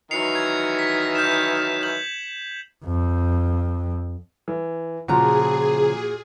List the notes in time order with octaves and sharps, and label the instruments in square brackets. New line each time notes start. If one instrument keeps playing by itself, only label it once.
[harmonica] D#3 E3 F#3 [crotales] C7 C#7 F7
[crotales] G#6
B6
G6 E7
G6 F#7
[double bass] F2
[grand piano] E3
[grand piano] A#2 F#4 [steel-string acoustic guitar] C#3 F3 A#5 [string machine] G#4